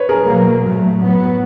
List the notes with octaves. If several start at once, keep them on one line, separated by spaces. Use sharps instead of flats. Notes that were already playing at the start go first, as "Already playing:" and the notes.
Already playing: B4 C#5
G#4 A#4
B2 F#3 A#3
A#2 F#3 A3
A2 F#3 B3